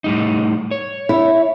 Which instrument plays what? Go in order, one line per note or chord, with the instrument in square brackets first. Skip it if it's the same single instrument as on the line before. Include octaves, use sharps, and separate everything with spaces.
[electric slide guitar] A2 G3 D#4
C#5
[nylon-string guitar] E4